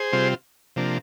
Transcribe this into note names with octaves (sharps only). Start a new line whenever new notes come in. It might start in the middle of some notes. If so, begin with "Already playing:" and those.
Already playing: G#4 C5
C3 G3 C4 F4
C3 F3 A#3 D4